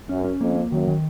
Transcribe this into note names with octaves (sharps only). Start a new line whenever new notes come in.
F#2 C#4
C#4
F2 A#3
A#3
F#2 D#3
D#3